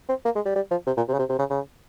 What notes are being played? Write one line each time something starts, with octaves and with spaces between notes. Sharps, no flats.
C4
A#3
G#3
G3
G3
F3
C3
A#2
C3
C#3
C3
C3
C#3
C#3